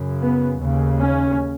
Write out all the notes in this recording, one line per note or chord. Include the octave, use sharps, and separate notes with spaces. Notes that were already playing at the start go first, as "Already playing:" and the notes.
Already playing: F#2 C#3
B3
D#2 C#3
C#4